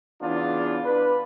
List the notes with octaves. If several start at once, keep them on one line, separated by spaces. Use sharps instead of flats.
E2 C#3 E3 D4 F4
D4 B4